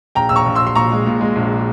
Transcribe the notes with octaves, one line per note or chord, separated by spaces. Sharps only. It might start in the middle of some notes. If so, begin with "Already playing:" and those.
A#1 G5 A#5
A#1 E6
A#5 C#6
A#1
C6 E6
A#1
C6
A#2 A#5 C#6
G#3
A#2
G#3
A#1